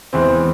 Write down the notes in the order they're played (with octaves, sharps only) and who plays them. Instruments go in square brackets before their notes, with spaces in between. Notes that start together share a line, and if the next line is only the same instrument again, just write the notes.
[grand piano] E2 E3 G#3 C4